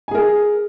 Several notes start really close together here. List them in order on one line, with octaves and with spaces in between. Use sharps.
G#5 G#4 A#4